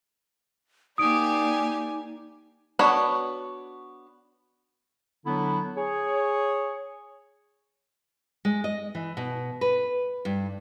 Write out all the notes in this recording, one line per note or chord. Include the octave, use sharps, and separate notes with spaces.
A#3 D#4 G4 D5 G#5 D#6 D7
B3 D4 F#4 C#5
D3 F#3 B3 D4 E4
G#4 C#5
G#3
D#5
E3
B2
B4
G2